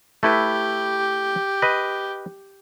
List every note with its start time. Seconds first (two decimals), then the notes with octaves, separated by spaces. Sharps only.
0.23 A3 E4 G4 B4
1.62 B4 D#5